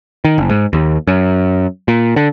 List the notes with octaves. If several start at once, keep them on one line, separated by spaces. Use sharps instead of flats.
D#3
F#1
G#2
D#2
F#2
A#2
D3